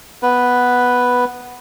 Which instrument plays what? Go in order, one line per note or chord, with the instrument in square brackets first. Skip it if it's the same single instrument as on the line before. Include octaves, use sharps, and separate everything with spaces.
[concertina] B3 B4